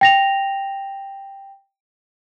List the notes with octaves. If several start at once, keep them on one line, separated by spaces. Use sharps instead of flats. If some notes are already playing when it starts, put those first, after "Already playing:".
G5 A#6 F7